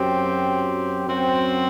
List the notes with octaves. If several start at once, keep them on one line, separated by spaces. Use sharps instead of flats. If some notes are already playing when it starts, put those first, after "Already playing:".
Already playing: F#2 F#3 C4 G4
F#2 F#3 C4 F#4